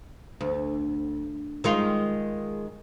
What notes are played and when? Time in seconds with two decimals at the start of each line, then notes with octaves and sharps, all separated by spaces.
0.41 D2
1.64 D#3 G#3 F4